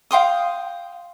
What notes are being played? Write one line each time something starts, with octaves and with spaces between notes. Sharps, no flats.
F5 G5 C6 D#6